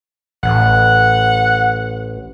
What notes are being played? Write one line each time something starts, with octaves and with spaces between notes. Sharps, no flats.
A1 F#5